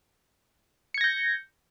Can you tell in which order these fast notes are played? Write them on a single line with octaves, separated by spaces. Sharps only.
C#7 G#6 A#6 G6